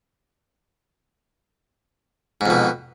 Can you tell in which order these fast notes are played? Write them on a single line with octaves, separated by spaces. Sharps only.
G#2 F2 B2